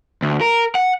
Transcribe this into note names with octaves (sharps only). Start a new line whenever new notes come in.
D2
A#4
F#5